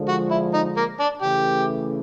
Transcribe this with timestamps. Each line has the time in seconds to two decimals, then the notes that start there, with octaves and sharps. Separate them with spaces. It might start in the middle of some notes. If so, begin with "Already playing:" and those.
Already playing: D3 F3 G#3
0.08 F#4
0.30 E4
0.53 D#4
0.77 A#3
0.99 D4
1.22 C#3 E3 A3 G4